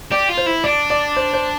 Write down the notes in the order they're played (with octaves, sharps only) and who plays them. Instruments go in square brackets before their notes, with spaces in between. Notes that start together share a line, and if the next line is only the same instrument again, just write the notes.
[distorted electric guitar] G4 [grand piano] D5
[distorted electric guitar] F4
[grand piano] C5
[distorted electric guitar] E4
[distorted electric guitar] D4 [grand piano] D5
[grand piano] D5
C5
C5